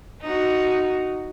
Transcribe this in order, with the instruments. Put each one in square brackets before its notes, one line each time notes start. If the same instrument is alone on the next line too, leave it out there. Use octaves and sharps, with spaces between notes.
[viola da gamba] D#4 F#4